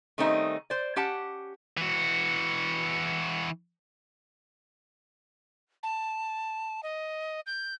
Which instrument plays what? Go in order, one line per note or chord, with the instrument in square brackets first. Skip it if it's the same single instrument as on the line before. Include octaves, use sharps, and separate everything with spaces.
[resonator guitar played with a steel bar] D#3 G3 A3 C4 C#4 D#4
C5 D5
C#4 G4 F#5 A5
[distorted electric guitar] E3 F#4
[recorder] A5
D#5
G6